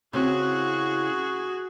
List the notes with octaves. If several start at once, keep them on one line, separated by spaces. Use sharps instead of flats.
C#3 C4 E4 F#4 G#4